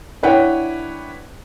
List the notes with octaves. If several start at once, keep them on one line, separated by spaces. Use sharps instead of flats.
D4 E4 B4 C#5 F#5 G5